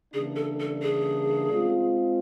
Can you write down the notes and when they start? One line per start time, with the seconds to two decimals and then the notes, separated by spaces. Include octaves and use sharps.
0.13 C#3 E3 G3 A#3 D4 G#4
0.36 A4
0.60 A4
0.83 G#4
1.52 G#3 C4 F4